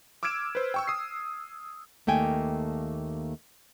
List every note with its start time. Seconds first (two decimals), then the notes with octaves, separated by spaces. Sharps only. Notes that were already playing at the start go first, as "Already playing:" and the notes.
0.23 D6 E6 F6 G#6 D7 E7
0.55 B4 C5
0.74 G5 C#6 E6
0.88 D#6 C7
2.07 D#2 A3 A#3 G5 G#5